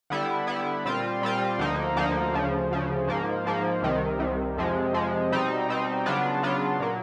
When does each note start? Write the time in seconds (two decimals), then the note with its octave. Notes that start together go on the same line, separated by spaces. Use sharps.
0.10 D3 G3 B3 E4
0.47 D3 G3 B3 E4
0.85 A#2 G3 C4 F4
1.22 A#2 G3 C4 F4
1.58 D2 D3 F3 A#3 D#4
1.96 D2 D3 F3 A#3 D#4
2.33 D2 C#3 F3
2.71 D2 C#3 F3
3.08 G#2 F3 A#3
3.46 G#2 F3 A#3
3.82 C2 C3 D#3
4.19 C2 C3 D#3
4.57 F2 C3 F3 G#3
4.93 F2 C3 F3 G#3
5.31 B2 G3 C4 D#4
5.68 B2 G3 C4 D#4
6.06 C#3 F#3 B3 D4 F4
6.43 C#3 F#3 B3 D4 F4
6.80 A#2 F#3 A#3